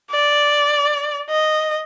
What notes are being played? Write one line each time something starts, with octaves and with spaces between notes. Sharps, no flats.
D5
D#5